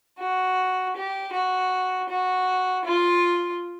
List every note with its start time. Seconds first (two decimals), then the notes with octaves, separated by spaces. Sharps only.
0.18 F#4
0.95 G4
1.32 F#4
2.08 F#4
2.84 F4